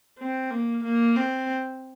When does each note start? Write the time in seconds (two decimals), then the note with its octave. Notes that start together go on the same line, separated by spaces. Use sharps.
0.19 C4
0.51 A#3
0.84 A#3
1.16 C4